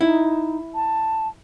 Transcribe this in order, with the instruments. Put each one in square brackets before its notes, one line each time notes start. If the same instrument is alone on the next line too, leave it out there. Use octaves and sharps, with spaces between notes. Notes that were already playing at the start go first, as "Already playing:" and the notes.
[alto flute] D#4 [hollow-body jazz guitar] E4
[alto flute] A5